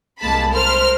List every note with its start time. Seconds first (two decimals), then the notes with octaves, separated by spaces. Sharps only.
0.20 C2 G#3 A#3 A5 B5
0.52 A#4 C5 F6